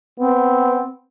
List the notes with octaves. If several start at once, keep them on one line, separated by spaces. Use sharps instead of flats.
B3 C4